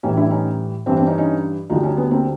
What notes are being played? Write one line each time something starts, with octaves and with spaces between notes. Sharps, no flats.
A2 E3 G3 C#4 D#4
D4 E4
C#4 D#4
G2 E3 G3 C4 D4
C4 D4
C#4 D#4
C#4 D#4
D2 D3 G3 D#4 F4
C#4 D#4
B3 C#4
A#3 C4